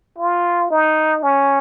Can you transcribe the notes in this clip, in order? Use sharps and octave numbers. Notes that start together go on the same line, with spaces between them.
F4
D#4
C#4